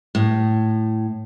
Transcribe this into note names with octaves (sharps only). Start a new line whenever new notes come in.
A2